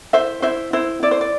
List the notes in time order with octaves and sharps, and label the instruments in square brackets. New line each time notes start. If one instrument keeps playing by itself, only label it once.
[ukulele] E4 C5 E5
E4 C5 E5
E4 C5
E4 D5
C5
D5